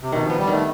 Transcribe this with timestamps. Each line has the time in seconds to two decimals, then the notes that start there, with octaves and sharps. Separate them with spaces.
0.02 C3
0.12 B2 D#3
0.25 F3 B3
0.38 G3
0.47 D#3 A3